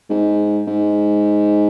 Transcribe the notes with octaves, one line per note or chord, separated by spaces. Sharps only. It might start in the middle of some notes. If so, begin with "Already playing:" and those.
G#2
G#2